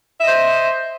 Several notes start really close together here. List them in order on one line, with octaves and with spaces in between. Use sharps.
E5 D#5 C5